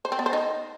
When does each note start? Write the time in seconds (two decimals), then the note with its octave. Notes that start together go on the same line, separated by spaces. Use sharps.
0.05 C5
0.12 C4
0.19 B3
0.26 C5
0.33 D#4